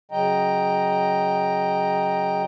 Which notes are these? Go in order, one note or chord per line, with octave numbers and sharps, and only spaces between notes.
C#3 F#3 D#5 G5 A#5